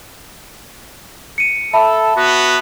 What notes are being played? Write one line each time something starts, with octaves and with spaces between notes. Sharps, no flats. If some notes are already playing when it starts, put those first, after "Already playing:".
C#7 D#7
A4 E5 A5 B5
B3 F#4